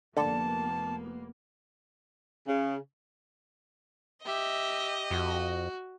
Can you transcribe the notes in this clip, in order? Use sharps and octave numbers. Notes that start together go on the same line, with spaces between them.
F1 D3 A#3 B3 A5
C#3
G4 D#5 E5
F2 F#4